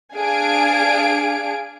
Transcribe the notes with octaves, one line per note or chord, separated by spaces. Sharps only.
D4 G#4 F5 G#5 D7